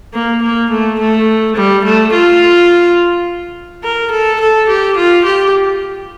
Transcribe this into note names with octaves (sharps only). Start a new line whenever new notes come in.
A#3
A#3
A3
A3
G3
A3
F4
A#4
A4
A4
G4
F4
G4